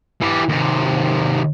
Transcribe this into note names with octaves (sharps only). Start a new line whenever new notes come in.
E3 G4
D#2 C3